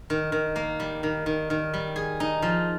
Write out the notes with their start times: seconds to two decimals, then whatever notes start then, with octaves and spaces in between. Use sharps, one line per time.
0.10 D#3
0.32 D#3
0.56 A#3
0.80 G3
1.03 D#3
1.26 D#3
1.50 D#3
1.74 G3
1.96 G#4
2.20 D#4
2.42 F3